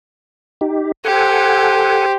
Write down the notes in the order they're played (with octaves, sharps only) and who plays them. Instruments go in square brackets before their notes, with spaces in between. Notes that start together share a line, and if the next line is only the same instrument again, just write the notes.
[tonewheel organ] D#4 G4
[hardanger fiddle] G4 C5 [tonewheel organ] A4 F#5 G#5